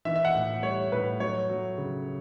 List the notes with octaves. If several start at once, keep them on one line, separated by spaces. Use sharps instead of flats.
E3 E5
E5
F#5
A2
G3 C#5
A2 B4
F#3 C#5
F#3
C#3